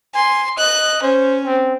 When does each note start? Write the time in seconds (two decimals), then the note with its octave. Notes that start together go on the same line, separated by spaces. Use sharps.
0.14 G#5 C6
0.58 D#5 F#6
1.02 C#4 C5
1.45 C4